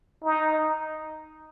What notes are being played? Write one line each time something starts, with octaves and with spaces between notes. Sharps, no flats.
D#4